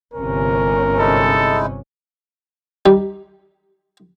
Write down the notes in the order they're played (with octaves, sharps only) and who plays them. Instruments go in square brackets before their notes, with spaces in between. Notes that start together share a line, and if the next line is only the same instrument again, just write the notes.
[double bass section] G1 C3 C#4 [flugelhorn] A#4
[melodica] G#3 D#4 E4 [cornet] A4
[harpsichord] G3 D#4 G4